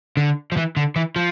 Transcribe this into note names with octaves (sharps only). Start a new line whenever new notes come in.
D3
F3
E3
D3
E3
F3